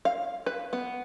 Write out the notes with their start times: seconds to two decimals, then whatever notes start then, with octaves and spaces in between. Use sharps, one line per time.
0.05 F5
0.46 B4
0.73 B3